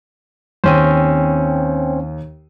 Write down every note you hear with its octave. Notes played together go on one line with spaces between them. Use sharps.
D#2 C4 C#4 C5 D#7